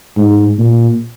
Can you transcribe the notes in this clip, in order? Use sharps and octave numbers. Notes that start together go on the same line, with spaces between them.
G#2
A#2